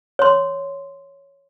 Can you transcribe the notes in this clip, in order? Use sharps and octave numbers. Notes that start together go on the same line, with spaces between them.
C#5 C6